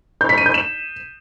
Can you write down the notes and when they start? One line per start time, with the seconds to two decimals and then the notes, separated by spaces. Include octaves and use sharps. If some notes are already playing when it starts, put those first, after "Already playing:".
0.21 G6
0.29 B6
0.38 D#7
0.46 G6
0.54 E7